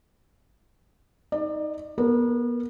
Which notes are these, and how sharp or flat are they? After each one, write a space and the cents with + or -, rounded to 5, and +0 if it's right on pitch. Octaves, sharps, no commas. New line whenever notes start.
D#4 +10 D5 +30
B3 -35 A#4 -20